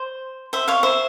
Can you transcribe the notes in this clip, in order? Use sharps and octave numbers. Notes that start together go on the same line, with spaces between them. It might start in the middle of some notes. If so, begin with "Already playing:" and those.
Already playing: C5
C5 E5
C#5 F5
C5 E5